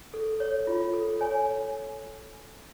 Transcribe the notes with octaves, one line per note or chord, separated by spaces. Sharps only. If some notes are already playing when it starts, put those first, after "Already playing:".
A4
C#5
F4
A4
C#5 G#5